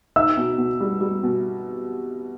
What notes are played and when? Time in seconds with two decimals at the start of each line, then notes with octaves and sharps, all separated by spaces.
0.16 D#4 E5 E6
0.37 B2
0.58 B2
0.80 G3
1.01 G3
1.23 B2